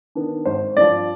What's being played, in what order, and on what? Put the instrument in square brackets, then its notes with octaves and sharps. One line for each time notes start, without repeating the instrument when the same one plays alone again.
[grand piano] D#3 B3 D4
G#1 C5
G2 F3 D5